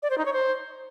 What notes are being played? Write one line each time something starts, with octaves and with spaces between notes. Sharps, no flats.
D5
C5
D#4
C#5
C5